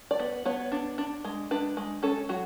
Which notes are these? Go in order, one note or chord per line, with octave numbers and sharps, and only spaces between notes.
D5
B3
B3 C#5
D4
D4
G#3
D4 B4
G#3
C#4 A4
F#3 F#4